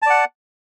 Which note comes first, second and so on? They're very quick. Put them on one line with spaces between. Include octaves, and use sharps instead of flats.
A5 D5 F#5